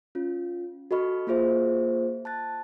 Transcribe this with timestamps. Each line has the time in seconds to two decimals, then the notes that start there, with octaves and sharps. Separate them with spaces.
0.15 C#4 F4
0.91 F#4 A4 D#5 B5 C#6 F6
1.27 A#3 F4 G#4 C5 E5
2.25 A5 F#6 A6